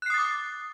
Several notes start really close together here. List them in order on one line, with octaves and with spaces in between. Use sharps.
F#6 C7 D#6 A6 D6